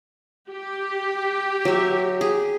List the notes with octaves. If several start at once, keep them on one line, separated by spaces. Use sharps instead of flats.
G4
F#3 E5
G#4